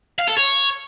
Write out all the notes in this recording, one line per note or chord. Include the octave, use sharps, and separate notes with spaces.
F5
A4
C#5